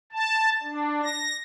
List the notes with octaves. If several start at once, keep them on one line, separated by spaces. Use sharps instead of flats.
A5
D4
A#6